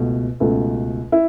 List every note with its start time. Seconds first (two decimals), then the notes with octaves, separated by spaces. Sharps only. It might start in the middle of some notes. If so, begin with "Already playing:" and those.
Already playing: C#2 B2 A3
0.40 C#2 B2 A3
1.12 E4